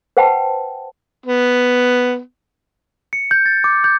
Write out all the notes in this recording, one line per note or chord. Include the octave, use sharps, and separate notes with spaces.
B4 C5 F#5 G5 A5 B5
B3
C#7
G6
A6
D6
G6